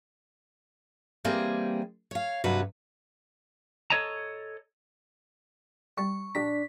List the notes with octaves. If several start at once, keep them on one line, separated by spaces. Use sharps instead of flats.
E3 G3 A#3 C4 G#4
C#5 F5
G2 C3 F#3 F#4 B4
A4 C#5 D#5 A5 A#5
C2 G3 A5 C#6
A#1 D4 G4 A#5 B6